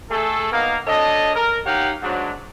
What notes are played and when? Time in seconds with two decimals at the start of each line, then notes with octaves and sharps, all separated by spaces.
0.11 A3 G#4 A4
0.52 A#3 B3 D#4 A#4 F5
0.87 D4 A4 C#5 D#5
1.35 A#4
1.66 D#4 G4 C#5 F5 F#5
2.02 G#2 F#3 D4